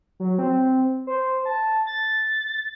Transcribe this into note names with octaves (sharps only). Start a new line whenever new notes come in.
F#3
C4
C5
A5
A6